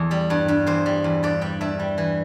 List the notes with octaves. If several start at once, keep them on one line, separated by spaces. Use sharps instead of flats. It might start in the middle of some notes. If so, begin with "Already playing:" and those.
Already playing: E2 A4
G3
G2
G2
E2 C5
G3
E2
G2 D5
G3 G5
G2 E5
G3
E3